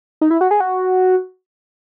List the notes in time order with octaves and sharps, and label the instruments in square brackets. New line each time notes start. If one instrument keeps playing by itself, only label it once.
[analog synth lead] D#4
E4
F#4
G#4
F#4